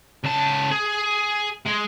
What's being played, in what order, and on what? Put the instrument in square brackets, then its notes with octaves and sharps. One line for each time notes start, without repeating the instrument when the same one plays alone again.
[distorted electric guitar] C#2 A5
G#4
G#3